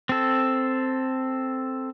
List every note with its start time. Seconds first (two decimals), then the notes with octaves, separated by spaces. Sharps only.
0.09 C4 A4